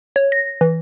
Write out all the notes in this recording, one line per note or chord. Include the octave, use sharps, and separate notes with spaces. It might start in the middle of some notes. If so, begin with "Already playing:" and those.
C#5
A#6
E3